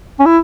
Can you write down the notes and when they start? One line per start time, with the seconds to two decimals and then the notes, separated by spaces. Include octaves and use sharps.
0.19 C#4
0.26 E4